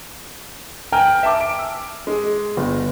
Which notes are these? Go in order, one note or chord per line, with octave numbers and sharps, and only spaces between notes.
G5 G#5 A#5 F6
E5 A5 D6
D7
E6
G#3
G1